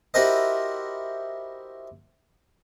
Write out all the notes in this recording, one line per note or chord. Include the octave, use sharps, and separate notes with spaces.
E4 F#4 G4 A#4 C5 D#5